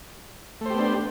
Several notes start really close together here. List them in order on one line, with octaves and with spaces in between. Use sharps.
A3 C5 G4 B3 D4